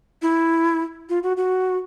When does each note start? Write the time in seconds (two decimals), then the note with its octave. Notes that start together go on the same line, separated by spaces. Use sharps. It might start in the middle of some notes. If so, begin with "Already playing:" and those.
0.22 E4
1.09 F4
1.23 F#4
1.37 F#4